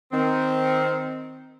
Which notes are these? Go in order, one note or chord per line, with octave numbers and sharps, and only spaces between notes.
D#3 C4